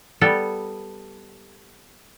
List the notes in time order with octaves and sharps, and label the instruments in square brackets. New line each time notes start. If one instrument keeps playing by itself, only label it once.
[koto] G3 B3 A4